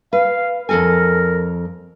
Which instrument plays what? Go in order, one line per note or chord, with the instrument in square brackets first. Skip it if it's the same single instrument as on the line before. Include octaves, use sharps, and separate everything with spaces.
[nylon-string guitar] B4 [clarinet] F5
[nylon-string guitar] F2 A4 G#5 [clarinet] A#4